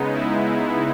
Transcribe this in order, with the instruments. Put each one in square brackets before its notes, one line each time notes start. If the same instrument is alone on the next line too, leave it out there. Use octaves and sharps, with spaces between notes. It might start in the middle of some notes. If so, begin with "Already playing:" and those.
Already playing: [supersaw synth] C#3 G#3 B3 D#4
E4